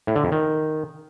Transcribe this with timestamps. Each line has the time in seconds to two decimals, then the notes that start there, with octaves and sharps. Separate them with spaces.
0.07 A2
0.16 D3
0.24 F2
0.32 D#3